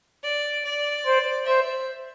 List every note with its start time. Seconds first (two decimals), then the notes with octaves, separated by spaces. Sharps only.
0.24 D5
0.65 D5
1.06 C5
1.46 C5 E5